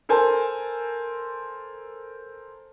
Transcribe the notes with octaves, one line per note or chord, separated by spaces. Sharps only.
A4 A#4 C5 G#5 A5